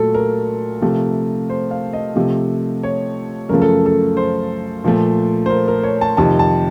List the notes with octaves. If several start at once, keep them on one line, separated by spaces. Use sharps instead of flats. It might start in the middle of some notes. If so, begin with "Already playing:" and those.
Already playing: A#2 F#3 A3 A4
A#4
C3 F3 A3
C5
F5
D#5
C3 F3 A3
C#5
F#2 C#3 F3 A3 A#4
A4
A4
C5
A#2 F3 A3
C5
A#4
A#4
C#5
A5
F2 C3 D#3 A5
A5